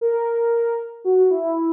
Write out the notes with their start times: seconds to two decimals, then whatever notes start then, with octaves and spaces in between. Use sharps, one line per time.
0.01 A#4
1.05 F#4
1.31 E4